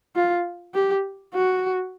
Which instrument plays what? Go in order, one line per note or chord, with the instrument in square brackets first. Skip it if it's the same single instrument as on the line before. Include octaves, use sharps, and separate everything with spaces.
[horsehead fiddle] F4
G4
F#4